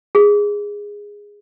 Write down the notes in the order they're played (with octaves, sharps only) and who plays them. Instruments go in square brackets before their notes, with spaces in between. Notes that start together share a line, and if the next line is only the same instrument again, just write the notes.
[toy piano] G#4